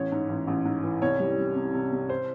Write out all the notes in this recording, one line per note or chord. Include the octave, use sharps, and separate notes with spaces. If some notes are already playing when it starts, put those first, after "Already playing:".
Already playing: A1 C#5
G#2
A1
A1
G#2
E3
C2 C#5
G3
G3
C3
C3
C3
C5